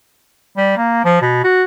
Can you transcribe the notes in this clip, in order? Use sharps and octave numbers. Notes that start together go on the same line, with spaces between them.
G3
A#3
F3
B2
F#4